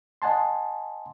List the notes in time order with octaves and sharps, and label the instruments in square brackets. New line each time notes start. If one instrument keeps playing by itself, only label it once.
[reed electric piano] D#5 F#5 G#5 A5 C6